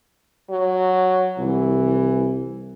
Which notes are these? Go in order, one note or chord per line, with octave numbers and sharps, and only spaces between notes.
F#3
C2 E3